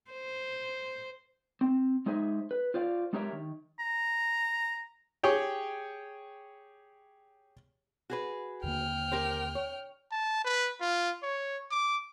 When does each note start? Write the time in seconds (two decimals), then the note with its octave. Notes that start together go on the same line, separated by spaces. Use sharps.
0.11 C5
1.61 C4
2.06 G#3 D#4 G#4 C5 E5
2.51 B4
2.74 F4 C5 D5 F5
3.13 G#3 D4 G4 A#4 C#5 E5
3.32 D#3
3.80 A#5
5.23 G4 G#4 C#5 G5
8.10 F#4 G#4 B4
8.63 D#2 D3 A#3 G5 F6
9.12 G4 A#4 C5
9.55 C#5
10.12 A5
10.44 B4
10.81 F4
11.23 C#5
11.71 D6